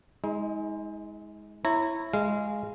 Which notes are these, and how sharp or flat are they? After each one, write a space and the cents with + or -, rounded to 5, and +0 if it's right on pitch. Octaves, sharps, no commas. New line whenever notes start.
G#3 +0 D#4 +40
E4 +0 C#5 -20 A#5 -20
G#3 +0 F5 -20